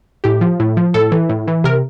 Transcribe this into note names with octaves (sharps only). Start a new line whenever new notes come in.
A2 G4
F3
A2
F3
A2 A4
E3
A2
E3
C3 A#4